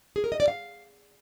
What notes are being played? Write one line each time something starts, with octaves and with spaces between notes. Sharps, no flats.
G#4
A#4
D#5
D5
F5